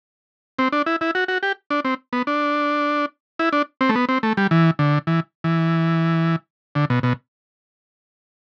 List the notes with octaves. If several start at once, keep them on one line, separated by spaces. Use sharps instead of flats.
C4
D4
E4
E4
F#4
F#4
G4
D4
C4
B3
D4
E4
D4
C4
A3
B3
C4
A3
G3
E3
D3
E3
E3
D3
B2
B2